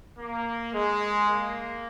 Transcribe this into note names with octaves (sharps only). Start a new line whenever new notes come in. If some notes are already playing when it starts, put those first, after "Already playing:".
A#3
G#3
A#3